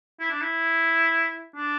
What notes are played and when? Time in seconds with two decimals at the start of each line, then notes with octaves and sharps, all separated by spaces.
0.20 E4
0.30 D4
0.41 E4
1.55 D4